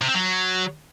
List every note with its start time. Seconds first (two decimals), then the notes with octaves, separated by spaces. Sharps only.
0.02 C3
0.08 C4
0.15 F#3